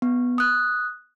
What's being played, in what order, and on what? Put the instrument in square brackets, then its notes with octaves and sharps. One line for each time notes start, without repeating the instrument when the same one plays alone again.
[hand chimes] B3
D#6 F#6